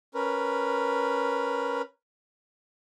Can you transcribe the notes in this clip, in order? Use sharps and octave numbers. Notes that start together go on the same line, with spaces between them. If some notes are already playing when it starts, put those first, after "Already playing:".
C#4 A#4 B4